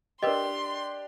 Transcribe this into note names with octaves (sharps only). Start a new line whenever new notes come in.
D4 G4 A#4 B4 D#5 C6